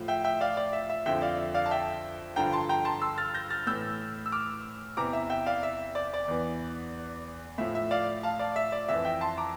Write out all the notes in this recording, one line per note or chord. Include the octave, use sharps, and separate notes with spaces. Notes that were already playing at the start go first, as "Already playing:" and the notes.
Already playing: A2 F3
E5 G5
E5 G5
D5 F5
D5
E5
E5
F2 D3 F3 E5 G5
D5 F5
E5
D5 F5
A5
E5 G5
G2 D3 F3 G5 A#5
A5 C6
G5 A#5
A5 C6
C6 E6
F6 A6
G6 A#6
F6 A6
A2 E3 E6 G6
E6
D6 F6
E2 C3 E3 A#5 D6
E5
E5 G5
D5 F5
E5
D5
D5
E2 E3
A2 F3 E5
E5
D5 F5
F5 A5
D5 F5
E5
D5
F2 E3 E5
E5 G5
A5 C6
A#5 D6